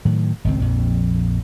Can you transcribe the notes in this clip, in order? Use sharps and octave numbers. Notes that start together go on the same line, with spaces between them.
A2 D#3 F#3
G#1 C#2 C4
A#1 F2